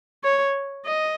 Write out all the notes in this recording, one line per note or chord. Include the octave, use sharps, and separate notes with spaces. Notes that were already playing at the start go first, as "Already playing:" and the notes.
C#5
D#5